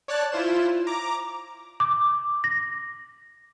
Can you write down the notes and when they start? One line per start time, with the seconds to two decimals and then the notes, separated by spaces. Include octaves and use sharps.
0.08 C#5 D5 A5 F#6 A6
0.32 E4 F4 C5 E7
0.87 A#5 D6
1.80 D6
2.44 A#6